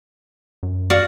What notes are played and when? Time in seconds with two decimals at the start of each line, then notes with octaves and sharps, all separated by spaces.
0.63 F#2
0.90 F#4 D5 F5